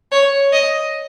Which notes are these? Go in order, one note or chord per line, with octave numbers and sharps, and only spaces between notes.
C#5
D#5